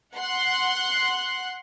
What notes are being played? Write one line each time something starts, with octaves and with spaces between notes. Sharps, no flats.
F#5 C6 F#6